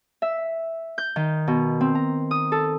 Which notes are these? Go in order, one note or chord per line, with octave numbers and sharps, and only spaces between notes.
E5
G6
D#3
B2
C4
A#5
D#6
A4